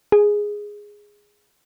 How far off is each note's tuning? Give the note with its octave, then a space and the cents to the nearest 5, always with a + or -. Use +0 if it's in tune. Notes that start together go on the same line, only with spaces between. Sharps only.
G#4 -5